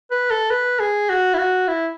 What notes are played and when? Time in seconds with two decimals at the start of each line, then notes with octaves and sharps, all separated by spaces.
0.11 B4
0.31 A4
0.51 B4
0.80 G#4
1.10 F#4
1.34 E4
1.38 F#4
1.68 E4